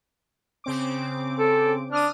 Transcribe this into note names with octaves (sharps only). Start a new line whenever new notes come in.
C#3 C4 D6
A4
D4 D#6 F6